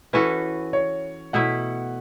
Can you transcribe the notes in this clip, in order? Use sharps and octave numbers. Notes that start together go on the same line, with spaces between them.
E3 C#4 F#4 A4 B4
C#5
B2 A3 E4 F#5